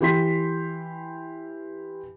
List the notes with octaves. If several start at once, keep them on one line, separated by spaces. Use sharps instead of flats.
E3 G4 C6 B6